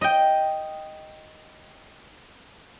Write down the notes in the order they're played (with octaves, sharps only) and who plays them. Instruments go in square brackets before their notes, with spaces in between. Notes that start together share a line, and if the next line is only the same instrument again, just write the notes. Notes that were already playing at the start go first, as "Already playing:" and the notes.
[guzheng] D#5 G5